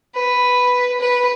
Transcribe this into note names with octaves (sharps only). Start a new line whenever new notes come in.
B4
B4